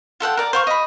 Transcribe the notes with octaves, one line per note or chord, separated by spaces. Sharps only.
F4 A4 F#5 G5
A#4 D5
C5 F5 C#6
D#5 B5